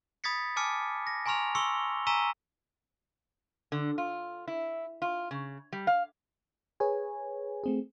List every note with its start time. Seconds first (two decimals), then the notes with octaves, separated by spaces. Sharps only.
0.24 B5 D#6 G#6 A6 B6 C#7
0.56 G#5 A5 D6 F6 C#7
1.07 A#6
1.26 G#5 A#5 C6 C#6 F6 F7
1.55 C6 C#6 E6 C#7 G7
2.07 G#5 A#5 C#6 E6 B6 D#7
3.72 D3
3.98 F4
4.48 E4
5.02 F4
5.31 C#3
5.73 G3
5.87 F5
6.80 G#4 B4 C#5 G#5
7.64 A3 C4 G#4